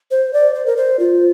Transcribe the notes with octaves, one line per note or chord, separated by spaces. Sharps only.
C5
D5
C5
A#4
C5
F4